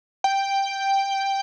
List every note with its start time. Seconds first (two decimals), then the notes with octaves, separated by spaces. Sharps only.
0.24 G5